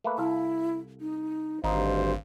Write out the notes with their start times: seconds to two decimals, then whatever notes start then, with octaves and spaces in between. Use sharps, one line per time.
0.04 A3 A#3 B4
0.18 C2 E4 A4 F5
1.01 D#4
1.64 G#1 D2 G2 D#4 C5 F5